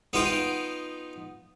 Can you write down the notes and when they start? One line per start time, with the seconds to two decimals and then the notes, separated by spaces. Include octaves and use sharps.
0.13 B3 D#4 F4 G5